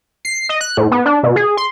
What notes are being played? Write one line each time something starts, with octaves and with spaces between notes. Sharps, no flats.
C7
D#5
F#6
A2
B3
D4
B2
G#4
C6